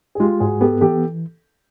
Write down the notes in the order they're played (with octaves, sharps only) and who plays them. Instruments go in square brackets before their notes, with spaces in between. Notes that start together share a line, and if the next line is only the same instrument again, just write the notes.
[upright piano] G#4
[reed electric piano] G#3 [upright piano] F4 G4
[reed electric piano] G#2 [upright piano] F#4 G#4
[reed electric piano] B3 [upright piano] G4 A4
[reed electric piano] E3 [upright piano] G4 A4